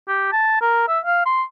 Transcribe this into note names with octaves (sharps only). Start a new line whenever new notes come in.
G4
A5
A#4
E5
F5
C6